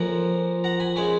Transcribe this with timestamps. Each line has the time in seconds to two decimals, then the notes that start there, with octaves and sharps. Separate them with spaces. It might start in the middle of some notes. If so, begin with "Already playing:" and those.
Already playing: F2 F3 A#3 C#4 F#5 A#5
0.64 F#5 A#5
0.80 G#5 B5
0.96 C#3 G#3 C#4 G#5 B5